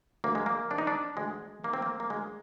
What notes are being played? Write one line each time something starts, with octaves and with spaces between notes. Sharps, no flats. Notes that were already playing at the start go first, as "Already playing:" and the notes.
D2 A#3
G#3
A#3
C3 D#3 D4
D#4
D4
D2 G#3
C3 D#3 A#3
C4
A#3
A#3
D2 G#3